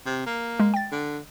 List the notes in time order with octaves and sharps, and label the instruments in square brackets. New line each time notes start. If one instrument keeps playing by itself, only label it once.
[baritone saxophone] C3
A#3
[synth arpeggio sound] G#3
G5 A6
[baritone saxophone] D3